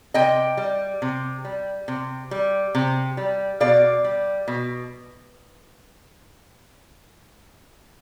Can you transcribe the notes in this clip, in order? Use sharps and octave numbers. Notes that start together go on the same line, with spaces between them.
C3 D#5 G5
G3
C3
G3
C3
G3
C3
G3
B2 D5 F5
G3
B2